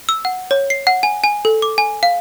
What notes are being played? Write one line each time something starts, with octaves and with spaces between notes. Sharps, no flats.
E6
F#5
C#5
C7
F#5
G#5
G#5
A4
D6
G#5
F5